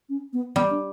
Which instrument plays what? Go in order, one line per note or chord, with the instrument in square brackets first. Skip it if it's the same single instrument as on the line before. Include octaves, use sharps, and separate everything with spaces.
[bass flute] C#4
B3
[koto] G3 [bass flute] B3
[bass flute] D4